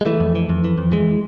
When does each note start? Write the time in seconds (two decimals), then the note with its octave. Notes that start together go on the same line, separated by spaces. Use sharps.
0.01 G#3
0.06 E3 A3
0.20 F2
0.35 E3
0.50 F2
0.64 E3
0.78 F2
0.92 E3 G#3